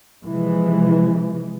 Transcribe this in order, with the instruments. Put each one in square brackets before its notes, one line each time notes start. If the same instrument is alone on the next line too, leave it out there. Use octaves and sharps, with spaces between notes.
[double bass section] C3 E3 F3 G#3